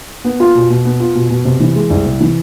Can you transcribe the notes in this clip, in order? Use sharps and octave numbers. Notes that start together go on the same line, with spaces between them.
B3
F4
B2
B2
B3
F4
B2
B2
C3
E3
G#3
C2
C3
E3